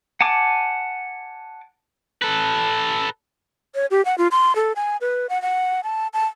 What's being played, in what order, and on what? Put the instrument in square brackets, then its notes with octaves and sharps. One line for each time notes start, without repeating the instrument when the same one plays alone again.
[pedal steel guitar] F#5 G#5 A5 D6
[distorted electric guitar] A4 B4
[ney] C#5
G4
F#5
F4
C6
A4
G#5
B4
F#5
F#5
A5
A5